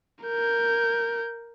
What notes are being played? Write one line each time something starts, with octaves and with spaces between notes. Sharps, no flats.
A#4 G6